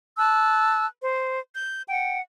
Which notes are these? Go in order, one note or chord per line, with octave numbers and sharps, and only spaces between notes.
A5 E6 F#6
C5
G6
F#5 G5